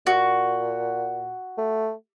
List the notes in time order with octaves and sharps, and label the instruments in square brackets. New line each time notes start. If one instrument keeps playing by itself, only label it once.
[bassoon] A#2 [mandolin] F#4
[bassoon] A3